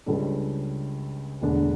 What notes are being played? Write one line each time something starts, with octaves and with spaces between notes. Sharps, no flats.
C#2 C#3 G3 D4 A4
E1 E2 D3 A3 D4